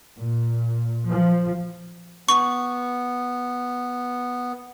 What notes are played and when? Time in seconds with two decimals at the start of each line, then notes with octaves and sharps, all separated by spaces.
0.18 A#2
1.08 F3
2.29 B3 C#6